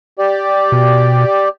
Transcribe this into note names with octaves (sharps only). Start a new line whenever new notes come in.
G4 D5
B2